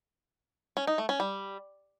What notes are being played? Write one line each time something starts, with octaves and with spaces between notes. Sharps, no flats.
C#4
D#4
A3
C#4
G3